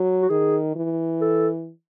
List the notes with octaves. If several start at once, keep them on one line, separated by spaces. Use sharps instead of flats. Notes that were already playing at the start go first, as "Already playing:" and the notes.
Already playing: F#3
F#4
D#3 G#4
E3
A4